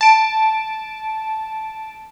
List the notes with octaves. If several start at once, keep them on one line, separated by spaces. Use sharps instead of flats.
A5 D7